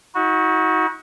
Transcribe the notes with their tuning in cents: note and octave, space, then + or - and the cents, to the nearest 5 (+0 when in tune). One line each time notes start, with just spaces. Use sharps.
D#4 +40 F#4 -10